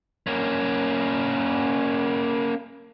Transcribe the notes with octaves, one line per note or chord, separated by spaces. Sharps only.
A#3 C#4